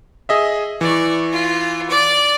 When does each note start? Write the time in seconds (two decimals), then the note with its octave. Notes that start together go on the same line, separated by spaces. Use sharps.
0.29 G#4 D#5 E5
0.81 E3 D5 C#6
1.32 F4
1.90 D5 D6